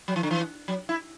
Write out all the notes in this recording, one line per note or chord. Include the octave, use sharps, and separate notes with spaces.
F#3
E3
D3
E3
F#3
E4